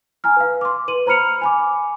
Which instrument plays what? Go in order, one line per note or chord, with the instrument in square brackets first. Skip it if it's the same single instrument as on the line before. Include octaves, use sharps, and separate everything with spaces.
[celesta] G#5 A#5 F6
B4 F5
C6 D6
B4 D#7 F#7
C5 A#5 B5 F6 C#7 F7
G#5 B5 D6